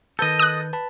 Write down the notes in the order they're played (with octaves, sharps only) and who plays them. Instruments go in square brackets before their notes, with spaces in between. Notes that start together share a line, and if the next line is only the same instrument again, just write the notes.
[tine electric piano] D#3 B4 G6 [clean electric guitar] A4 D#5
[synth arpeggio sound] D#6 F#6
[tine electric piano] B4 A5 B5